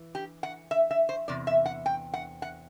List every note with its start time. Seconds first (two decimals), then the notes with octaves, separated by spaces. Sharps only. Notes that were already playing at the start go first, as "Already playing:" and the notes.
Already playing: E3
0.15 G4
0.43 F#5
0.71 E5
0.91 E5
1.09 C5
1.28 E2 C3 D5
1.47 E5
1.66 F#5
1.86 G5
2.14 F#5
2.42 F#5